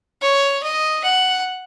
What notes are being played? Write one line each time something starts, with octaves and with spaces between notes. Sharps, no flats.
C#5
D#5
F#5